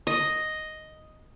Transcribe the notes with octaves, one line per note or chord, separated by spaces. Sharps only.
D#5